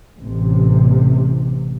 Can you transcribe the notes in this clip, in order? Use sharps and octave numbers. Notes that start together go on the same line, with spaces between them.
A1 C3